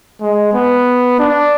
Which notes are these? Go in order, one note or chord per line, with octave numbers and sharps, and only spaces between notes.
G#3
B3
D4